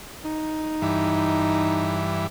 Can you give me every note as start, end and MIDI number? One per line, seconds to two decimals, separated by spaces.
0.25 2.16 63
0.82 2.27 43
0.82 2.27 52